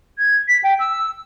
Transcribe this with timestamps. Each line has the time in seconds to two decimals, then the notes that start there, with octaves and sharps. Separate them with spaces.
0.19 G#6
0.48 B6
0.64 G5
0.80 E6